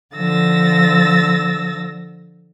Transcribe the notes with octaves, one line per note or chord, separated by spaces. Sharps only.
D3 F3 E6 A6 A#6